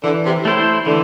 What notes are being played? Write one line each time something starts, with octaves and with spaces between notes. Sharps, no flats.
D3 E3
C3
A2 A3 E4 C5
D3 E3